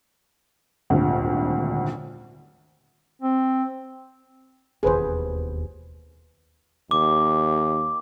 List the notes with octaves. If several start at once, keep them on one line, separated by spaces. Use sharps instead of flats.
D#1 G#1 D2
C4
E1 D#2 G#4 B4 C5
D#2 D6